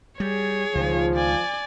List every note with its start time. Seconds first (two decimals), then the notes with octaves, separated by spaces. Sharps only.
0.20 G3 G#4 C#5
0.75 C#2 D#3 F3
1.16 D5 G#5